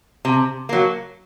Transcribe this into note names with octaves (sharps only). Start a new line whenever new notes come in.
C3
F#3 A#3